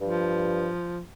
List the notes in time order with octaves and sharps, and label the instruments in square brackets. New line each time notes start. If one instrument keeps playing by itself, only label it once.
[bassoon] G2 [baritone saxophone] F3